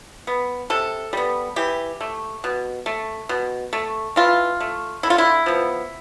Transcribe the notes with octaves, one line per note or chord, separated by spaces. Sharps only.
B3
C3 A4
G3 B3
E3 G4
A3
B2
A3
B2
A3
E3 F4
A3
D3 E4
F4
E4
F3 B3